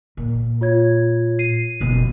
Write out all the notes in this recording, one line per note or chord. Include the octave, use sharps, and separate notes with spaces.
A#2
F4 C#5 G#6
C7 D#7
F#1 B2